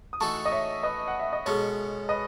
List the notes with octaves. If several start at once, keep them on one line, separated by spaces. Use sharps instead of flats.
D#6
E3 A3 D#4 F#4 A5 C#6
D#5
C#5 E5
B4 D#5
F#5
E5
D#5
B2 G#3 C#4 A4 C#5
B4 D#5